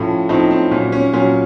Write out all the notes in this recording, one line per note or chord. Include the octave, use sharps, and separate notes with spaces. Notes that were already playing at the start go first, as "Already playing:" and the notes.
Already playing: A2 F3 C#4
A2 F3 C4 D#4
C4
A#2 F#3 C#4
C#4
A#2 F#3 C#4